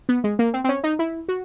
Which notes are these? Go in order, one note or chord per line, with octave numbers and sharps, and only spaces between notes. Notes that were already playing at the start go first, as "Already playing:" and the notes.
B3
G#3
A#3
C4
C4
C#4
D#4
E4
F#4